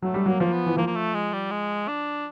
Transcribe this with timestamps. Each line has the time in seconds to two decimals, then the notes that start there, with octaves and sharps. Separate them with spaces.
0.02 F#3 A3
0.14 G3
0.26 F#3 A#3
0.40 F3 A#3
0.53 B3
0.66 E3
0.77 F3 A#3
0.87 A#3
0.96 A3
1.15 G#3
1.33 G3
1.51 G#3
1.88 D4